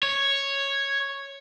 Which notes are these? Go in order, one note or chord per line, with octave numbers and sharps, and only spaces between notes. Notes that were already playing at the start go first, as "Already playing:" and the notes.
C#5